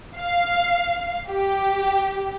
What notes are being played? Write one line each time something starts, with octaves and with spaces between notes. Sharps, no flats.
F5
G4